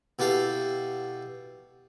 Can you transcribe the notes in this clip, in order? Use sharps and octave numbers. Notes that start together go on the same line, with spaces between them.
B2 E4 G4 A4 F5